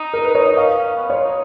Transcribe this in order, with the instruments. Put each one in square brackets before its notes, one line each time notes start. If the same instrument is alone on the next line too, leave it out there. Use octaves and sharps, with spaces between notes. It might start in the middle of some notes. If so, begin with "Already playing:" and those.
Already playing: [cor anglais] D#4
[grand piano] A#4
B4
C#5
[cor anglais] D#4 [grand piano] D#5
[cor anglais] C#4 [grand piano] F5
[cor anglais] B3
[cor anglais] F4 [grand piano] C#5
[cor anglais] D#4